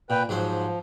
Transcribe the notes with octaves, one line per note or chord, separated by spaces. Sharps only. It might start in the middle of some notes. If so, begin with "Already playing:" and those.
A#2 B4 G5
G#2 F3 F#3 C5